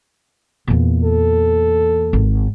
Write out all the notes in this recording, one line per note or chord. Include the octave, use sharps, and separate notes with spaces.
E2 A#2
A4
G#1